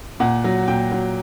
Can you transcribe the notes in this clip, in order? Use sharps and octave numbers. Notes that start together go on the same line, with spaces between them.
A#2 F#5
F#3
A#2 G5
F#3